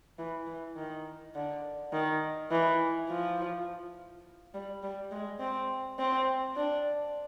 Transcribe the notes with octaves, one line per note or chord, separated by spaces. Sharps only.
E3
E3
D#3
D3
D#3
E3
F3
G3
G3
G#3
C4
C4
D4